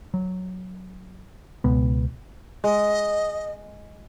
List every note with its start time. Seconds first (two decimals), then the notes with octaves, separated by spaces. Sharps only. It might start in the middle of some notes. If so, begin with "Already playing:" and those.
0.14 F#3
1.64 C#2 B2 B3
2.64 G#3 D#5